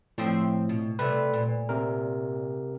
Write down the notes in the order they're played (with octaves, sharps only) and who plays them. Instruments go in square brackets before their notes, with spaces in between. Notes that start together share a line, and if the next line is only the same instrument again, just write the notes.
[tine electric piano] A2 [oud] F3 C4 E5
[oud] B2
[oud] C3 G3 A3 [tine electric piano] B4
[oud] A#2
[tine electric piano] C3 A#4